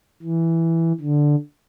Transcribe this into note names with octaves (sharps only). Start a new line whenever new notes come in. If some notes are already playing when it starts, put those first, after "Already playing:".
E3
D3